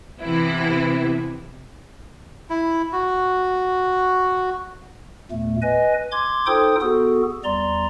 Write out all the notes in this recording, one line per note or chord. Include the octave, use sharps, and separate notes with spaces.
C3 E3 B3 E4
E4
F#4
E2 A#2 A3
B4 D#5 G#5
C6 D6 G#6
D#4 F4 A4 C5 G5 D#6
B3 F#4 G#4 A4
E2 G3 D5 A#5 C6